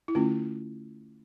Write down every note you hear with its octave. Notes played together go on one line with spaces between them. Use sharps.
E4
D3 A3 C#4 F4